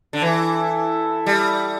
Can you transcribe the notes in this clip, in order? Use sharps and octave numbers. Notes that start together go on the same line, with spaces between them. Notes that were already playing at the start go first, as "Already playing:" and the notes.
D3
E3 E4 A4 E5
G3